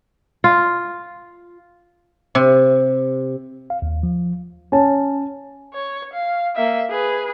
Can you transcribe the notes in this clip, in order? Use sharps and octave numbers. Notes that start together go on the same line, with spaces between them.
F4
C3
F5
D#2
F3
C#4 A5
C#5
F5
A#3 E5
G#4 B4